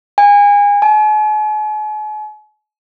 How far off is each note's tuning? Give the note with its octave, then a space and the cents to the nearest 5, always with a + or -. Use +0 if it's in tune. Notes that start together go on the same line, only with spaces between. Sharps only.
G#5 -30
G#5 +45